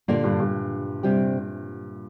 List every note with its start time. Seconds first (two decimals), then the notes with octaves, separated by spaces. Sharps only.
0.08 A#2 D3 A#3 G4 D5 F5
0.24 G2
0.40 G2
1.03 C3 G3 C4 G4